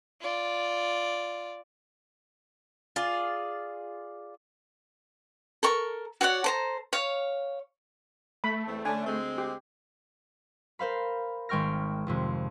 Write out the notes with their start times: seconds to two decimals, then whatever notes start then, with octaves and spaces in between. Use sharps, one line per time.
0.21 F4 D5
2.96 F4 G#4 D5
5.63 A4 A#4 C#6
6.21 F#4 C#5 D5 F#5
6.44 A4 C5 A#5
6.93 C#5 F5
8.44 A3 B5
8.67 E2 C4
8.85 D3 C#4 D4 G#5
9.07 D2 G#3 C4
9.38 G4
10.79 A#4 C5 F5 B5
11.49 G#1 G#3 G5 C#6 F6 A#6
12.07 G#1 F2 C3